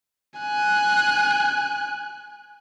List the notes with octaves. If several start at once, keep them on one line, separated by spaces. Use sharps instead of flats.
G#5 F#6